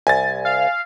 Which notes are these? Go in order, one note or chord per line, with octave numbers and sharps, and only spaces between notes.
C2 G#5 A6
F5